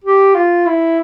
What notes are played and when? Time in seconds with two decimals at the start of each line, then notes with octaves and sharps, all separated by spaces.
0.04 G4
0.35 F4
0.66 E4